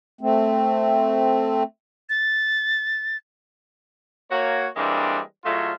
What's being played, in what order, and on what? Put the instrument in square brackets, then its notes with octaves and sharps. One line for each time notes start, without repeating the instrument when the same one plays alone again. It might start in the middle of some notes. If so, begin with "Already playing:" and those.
[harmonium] A3 C4
[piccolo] A6
[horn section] A#3 F#4 C#5
E3 G3 G#3 A#3 C4 D4
A2 F#3 G#3 A3 F4